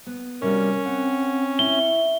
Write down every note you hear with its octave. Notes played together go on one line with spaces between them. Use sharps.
B3
C3 G3 C#4 F#4 A#4
C4 F#5
E4 G7